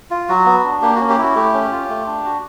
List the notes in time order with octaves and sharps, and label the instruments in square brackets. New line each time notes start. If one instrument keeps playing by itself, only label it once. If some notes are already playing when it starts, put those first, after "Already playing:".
[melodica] F4
F#3 F#4
B3
D4
A#3 G4
C#4 F#4
G4
E4 F#4
A3 G4
C#4
F4
A3
D4
F#4